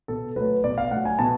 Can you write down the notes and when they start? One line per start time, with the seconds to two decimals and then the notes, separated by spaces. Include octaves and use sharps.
0.08 B2 A4
0.36 F#3 A3 B4
0.64 B2 D5
0.78 F5
0.91 F#3 A3 F#5
1.05 G#5
1.19 B2 A5